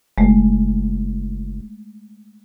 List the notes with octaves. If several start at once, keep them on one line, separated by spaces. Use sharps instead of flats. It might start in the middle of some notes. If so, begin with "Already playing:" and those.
F#1 G#3 A3